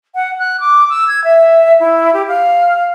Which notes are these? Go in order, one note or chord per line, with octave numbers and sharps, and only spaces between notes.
F#5
F#6
D6
E6
G#6
E5
E4
G4
F5